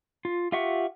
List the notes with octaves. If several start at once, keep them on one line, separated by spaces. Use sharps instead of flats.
F4
F4 G4 E5 F#5 C#6